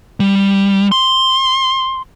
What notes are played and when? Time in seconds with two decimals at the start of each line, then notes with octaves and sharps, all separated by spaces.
0.20 G3
0.92 C6